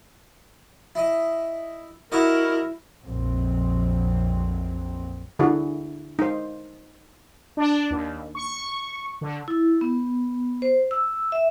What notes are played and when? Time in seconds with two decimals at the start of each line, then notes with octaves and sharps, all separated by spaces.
0.95 E4 D#5
2.12 E4 F#4 A#4 C#5 D#5
3.03 A#1 F2 F#3 C4
5.39 D3 E4 F#4 G#4
6.19 D#4 C5
7.57 D4
7.90 D#2
8.35 C#6
9.21 D3
9.48 E4
9.81 B3
10.62 C5
10.91 E6
11.32 E5